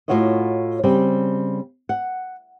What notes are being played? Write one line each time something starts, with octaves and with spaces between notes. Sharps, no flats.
A2 B3 F4 F#4 C#5 D#5
C#3 G3 C4
F#5